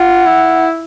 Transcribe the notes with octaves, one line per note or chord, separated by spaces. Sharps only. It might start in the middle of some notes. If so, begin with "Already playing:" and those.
Already playing: F4 F#5
E4